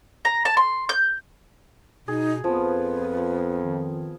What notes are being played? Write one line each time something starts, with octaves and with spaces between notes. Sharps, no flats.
A#5
A5
C6
G6
B2 D#4 G#4
F2 F3 B3 F4 B4
D#3